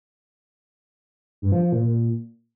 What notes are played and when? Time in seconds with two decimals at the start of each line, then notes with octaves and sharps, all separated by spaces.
1.42 G2
1.52 F3
1.62 F3
1.72 A#2
1.82 A#2